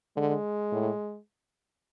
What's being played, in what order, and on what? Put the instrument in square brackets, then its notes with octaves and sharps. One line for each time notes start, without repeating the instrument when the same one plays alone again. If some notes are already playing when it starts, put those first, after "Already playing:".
[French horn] D3 [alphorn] G#3
[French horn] A2